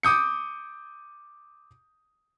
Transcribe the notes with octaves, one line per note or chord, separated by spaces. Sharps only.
D6 D#6 G6 C#7